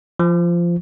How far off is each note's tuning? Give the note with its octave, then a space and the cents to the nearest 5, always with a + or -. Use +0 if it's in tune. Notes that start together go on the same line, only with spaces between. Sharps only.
F3 -15